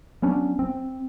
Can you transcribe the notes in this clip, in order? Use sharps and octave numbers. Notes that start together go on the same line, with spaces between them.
F#3 B3 C#4 D4
C4